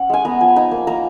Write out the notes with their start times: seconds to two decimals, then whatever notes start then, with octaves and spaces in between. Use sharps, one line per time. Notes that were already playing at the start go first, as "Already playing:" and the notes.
Already playing: C#4 F#5
0.10 G#3 G#5
0.25 B3 A#5
0.41 F3 G#5
0.56 D#4 A#5
0.71 A#3
0.87 A#3 A#5